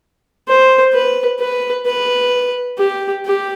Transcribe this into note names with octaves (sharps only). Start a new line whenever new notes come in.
C5
B4
B4
B4
G4
G4